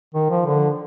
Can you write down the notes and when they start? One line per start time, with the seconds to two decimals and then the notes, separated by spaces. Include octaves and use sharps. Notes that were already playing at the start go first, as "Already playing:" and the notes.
0.14 D#3
0.30 F3
0.46 D3